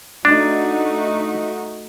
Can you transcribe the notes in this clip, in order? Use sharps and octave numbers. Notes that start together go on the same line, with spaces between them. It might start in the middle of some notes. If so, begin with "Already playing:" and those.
A3 D4 D#4 F#4